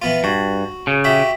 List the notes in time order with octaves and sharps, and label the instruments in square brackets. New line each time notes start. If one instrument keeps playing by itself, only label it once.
[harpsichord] E3 B3 F4
[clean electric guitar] G2 [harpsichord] F#4
[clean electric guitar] C#3
[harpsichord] F#4 G4 E5